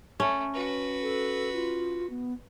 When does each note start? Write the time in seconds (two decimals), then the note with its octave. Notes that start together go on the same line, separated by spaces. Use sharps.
0.20 A3 C#4
0.54 F#4 B4
1.02 A4
1.54 F4
2.10 B3